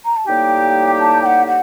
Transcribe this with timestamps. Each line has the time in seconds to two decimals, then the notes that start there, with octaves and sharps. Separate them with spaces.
0.05 A#5
0.17 A5
0.26 A2 G3 A#3 D#4 G4 G5
0.99 A5
1.22 G5
1.26 F#5
1.47 F#5